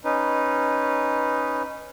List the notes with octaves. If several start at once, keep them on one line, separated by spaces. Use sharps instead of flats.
C#4 D#4 B4